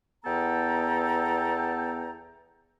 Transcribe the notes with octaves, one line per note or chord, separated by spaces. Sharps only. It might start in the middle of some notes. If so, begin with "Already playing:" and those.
E2 B3 A4 G5 A#5